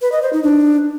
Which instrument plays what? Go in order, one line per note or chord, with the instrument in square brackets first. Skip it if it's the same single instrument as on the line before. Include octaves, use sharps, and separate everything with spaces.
[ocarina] B4
D#5
C5
D#4
D4